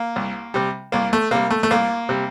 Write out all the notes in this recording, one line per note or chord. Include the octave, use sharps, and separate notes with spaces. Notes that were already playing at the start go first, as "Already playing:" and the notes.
Already playing: A#3
C2
C3 G3
C2 A#3
A3
C3 G3 A#3
A3
A3
C2 A#3
C3 G3